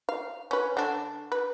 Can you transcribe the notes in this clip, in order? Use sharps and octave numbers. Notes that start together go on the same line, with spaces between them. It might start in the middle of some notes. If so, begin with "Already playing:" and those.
F5
C#4 B4
D3 D4
B4